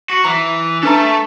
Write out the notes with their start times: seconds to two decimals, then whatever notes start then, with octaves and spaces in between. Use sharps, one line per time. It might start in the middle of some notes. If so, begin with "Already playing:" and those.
0.10 F#4
0.24 E3 A#5
0.83 A3 D4 A4 B4 A#5